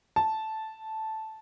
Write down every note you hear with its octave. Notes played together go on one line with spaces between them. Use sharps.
A5